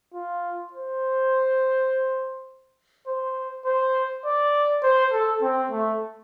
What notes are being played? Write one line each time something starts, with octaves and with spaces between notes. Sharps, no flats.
F4
C5
C5
C5
D5
C5
A4
C4
A3